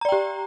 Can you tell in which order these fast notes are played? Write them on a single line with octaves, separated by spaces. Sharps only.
A#5 D5 G5 G4